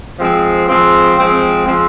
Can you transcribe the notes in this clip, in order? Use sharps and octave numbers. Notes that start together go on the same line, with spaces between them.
F3 G#3 C4
F3 G#3 C4
F3 G#3 C4
F3 G#3 C4